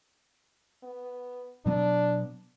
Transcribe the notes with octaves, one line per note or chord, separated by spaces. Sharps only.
B3
B2 F#3 B3 D4